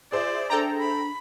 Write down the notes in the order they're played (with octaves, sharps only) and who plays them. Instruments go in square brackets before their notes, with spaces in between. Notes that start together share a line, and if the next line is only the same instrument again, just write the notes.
[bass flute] F4 [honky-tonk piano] G#4 C5 E5 [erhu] D5
[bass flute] D4 [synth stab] A4 G5 A#5
[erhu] B5